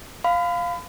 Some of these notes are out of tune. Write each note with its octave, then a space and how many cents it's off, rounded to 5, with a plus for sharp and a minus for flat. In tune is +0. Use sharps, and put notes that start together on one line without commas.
F5 +0 B5 +35